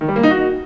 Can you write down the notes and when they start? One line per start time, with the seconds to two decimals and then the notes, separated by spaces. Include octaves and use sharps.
0.01 D#3
0.08 G3
0.16 A#3
0.23 D#4
0.31 F#4